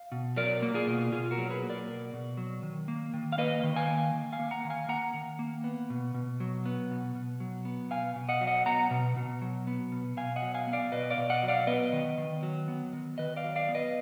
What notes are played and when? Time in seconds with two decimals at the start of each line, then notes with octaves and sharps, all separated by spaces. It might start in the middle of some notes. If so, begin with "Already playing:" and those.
Already playing: F5
0.12 B2
0.36 F#3 A#4 D5
0.62 A#3
0.74 F4 G#4
0.87 B2
1.12 B2 F4 G#4
1.31 F#4 A#4
1.38 F#3
1.50 G#4 B4
1.63 A#3
1.69 A#4 D5
1.87 B2
2.13 B2
2.37 F#3
2.63 D#3
2.88 A#3
3.14 D#3
3.32 F5
3.38 A#3 B4 D#5
3.64 D#3
3.76 F5 G#5
3.88 A#3
4.14 D#3
4.33 F5 G#5
4.39 A#3
4.51 F#5 A#5
4.65 D#3
4.70 F5 G#5
4.89 A#3 F#5 A#5
5.14 D#3
5.39 A#3
5.64 B3
5.90 B2
6.14 B2
6.40 F#3
6.66 B3
6.91 B2
7.15 B2
7.40 F#3
7.65 B3
7.91 B2 F5 G#5
8.16 B2
8.29 D#5 F#5
8.41 F#3
8.47 D#5 F#5
8.66 B3 F#5 A#5
8.91 B2
9.17 B2
9.42 F#3
9.67 B3
9.92 B2
10.17 B2 F5 G#5
10.36 D#5 F#5
10.42 F#3
10.54 F5 G#5
10.67 B3
10.73 D5 F5
10.92 B2 B4 D#5
11.10 D5 F5
11.17 B2
11.30 D#5 F#5
11.43 F#3
11.48 D5 F5
11.67 B3 B4 D#5
11.93 D#3
12.18 D#3
12.43 F#3
12.68 B3
12.93 D#3
13.18 D#3 B4 D#5
13.36 D5 F5
13.44 F#3
13.56 D5 F5
13.69 B3
13.75 B4 D#5